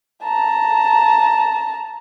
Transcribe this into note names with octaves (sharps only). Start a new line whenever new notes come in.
A5 A#5